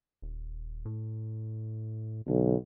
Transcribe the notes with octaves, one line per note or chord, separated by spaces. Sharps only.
D#1
A2
B1 D3